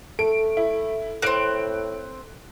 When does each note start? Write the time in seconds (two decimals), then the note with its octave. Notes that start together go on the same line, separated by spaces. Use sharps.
0.19 A3 A4 D7
0.57 E4
1.22 A2 A#3 C4 F#6 D7